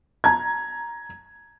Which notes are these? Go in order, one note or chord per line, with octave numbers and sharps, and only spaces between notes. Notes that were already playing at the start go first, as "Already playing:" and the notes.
A#5 G#6